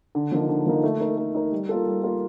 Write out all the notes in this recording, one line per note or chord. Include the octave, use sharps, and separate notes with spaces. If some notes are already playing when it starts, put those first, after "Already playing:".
D3
F3 A#3 D#4
D3
F3 A#3 D#4
A3
D#4 A#4
A3
D#4 A#4
G3
A#3 F4 A4
G3
A#3 F4 A4